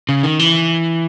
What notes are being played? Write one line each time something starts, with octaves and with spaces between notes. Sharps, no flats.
C#3
D#3
E3